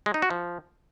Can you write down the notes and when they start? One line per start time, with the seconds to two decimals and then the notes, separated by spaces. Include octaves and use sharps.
0.06 G#3
0.14 D#4
0.22 F#4
0.30 F3